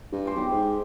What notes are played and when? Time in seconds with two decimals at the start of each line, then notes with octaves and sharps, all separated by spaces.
0.12 G2
0.25 C5 G#5 D6
0.36 B1 G4
0.51 G#2